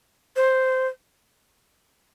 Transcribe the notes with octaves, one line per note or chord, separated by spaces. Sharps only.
C5